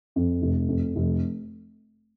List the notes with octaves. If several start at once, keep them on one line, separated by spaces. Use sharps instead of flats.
F2
F1
F2
F1